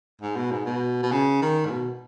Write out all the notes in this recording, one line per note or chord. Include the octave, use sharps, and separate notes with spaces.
G#2
B2
G#2
B2
B2
C#3
D#3
G#2
B2